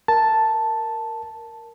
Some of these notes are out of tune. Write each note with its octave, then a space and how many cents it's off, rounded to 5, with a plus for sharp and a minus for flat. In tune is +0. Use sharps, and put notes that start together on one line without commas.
A#4 +0 A5 +0